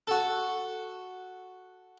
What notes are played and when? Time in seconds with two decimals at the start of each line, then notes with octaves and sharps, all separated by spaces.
0.07 F#4 A4